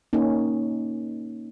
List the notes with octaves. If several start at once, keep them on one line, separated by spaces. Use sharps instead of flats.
A#3 C#4 D#4